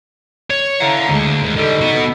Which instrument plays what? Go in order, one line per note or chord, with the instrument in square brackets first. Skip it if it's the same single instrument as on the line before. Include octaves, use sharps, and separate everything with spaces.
[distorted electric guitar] C#5
[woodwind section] E4 F5 A#5 [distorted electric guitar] A4 F#5
[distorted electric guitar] D2 [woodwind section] G#3
[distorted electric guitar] D#2
[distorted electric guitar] D3 G3 [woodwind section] D#4 A4
[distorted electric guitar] B3 F#4